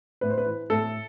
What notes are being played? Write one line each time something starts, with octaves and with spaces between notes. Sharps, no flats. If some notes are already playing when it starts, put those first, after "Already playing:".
A2 B4
C5
B4
E3
A2 A4